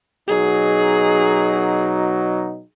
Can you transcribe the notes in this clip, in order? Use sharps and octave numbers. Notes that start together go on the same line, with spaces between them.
B2 F#3 D#4 G#4